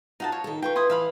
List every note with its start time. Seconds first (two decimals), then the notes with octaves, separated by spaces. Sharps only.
0.20 D#4 F4 F#4 A5
0.32 C#5
0.44 D#3 A4
0.62 F4 B4 G5 C#6
0.76 E4 C6 D#6
0.90 E3 E5 F5 B5